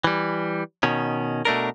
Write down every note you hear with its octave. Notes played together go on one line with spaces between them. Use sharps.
E3 G3
B2 D#3 C#4
B2 A3 D4 A#4